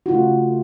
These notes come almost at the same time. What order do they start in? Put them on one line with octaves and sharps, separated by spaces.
F#4 F4 C#3 A3